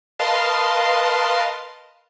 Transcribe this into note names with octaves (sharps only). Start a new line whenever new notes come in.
A#4 B4 D#5 F5 A5 C6